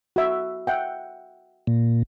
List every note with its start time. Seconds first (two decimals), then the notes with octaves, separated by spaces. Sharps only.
0.16 F#4 E5
0.67 E5 F#5 G5
1.67 A#2